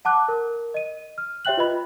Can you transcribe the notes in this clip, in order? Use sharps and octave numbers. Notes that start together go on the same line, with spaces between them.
F#5 A5 D6 F#6
A#4
D#5 D#7
F6
G4 C#5 E5 G5 F#6 F#7
F4 B4 D#5 B5